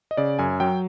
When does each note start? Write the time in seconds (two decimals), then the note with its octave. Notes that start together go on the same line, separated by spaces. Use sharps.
0.11 D#5
0.17 C#3 D5
0.39 F#2 G#5
0.60 F#3 G5